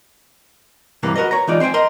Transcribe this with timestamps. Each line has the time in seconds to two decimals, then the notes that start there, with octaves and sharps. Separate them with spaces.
1.03 G2 C3 E3 A#3
1.16 F#4 A#4 B4 D#5
1.31 C#5 A#5
1.47 E3 G#3 D#4 F4 D5
1.60 C4 C5 C#5 G5 G#5
1.74 A#4 D#5 C6